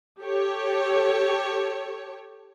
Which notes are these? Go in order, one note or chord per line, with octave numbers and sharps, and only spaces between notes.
G4 A4 C#5